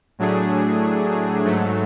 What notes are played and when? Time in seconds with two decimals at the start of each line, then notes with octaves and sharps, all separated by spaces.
0.19 A2 F#3 A3 D4 G#4
1.44 G#2 F#3 A3